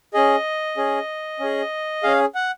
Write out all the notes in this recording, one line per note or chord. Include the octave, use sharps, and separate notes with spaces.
C#4 G#4 D#5
C#4 G#4
C#4 G#4
C#4 G#4 F5
F#5